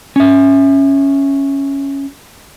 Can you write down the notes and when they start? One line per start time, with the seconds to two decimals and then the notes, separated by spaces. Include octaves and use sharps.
0.16 C#4 E5